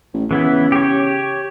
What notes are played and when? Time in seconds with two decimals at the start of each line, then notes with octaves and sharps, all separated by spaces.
0.14 A1
0.31 C#3 E3 B3 E4
0.72 G4 C#5